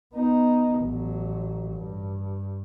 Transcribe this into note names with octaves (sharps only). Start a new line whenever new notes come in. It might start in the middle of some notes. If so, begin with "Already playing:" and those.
B3 D#4
A1 F#3
G2